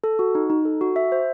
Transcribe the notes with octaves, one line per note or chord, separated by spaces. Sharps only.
A4
F#4
D#4
D#4
A4
F#4
E5
C5